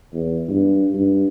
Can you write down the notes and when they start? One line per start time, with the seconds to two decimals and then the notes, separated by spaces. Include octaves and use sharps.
0.13 E2
0.49 G2
0.94 G2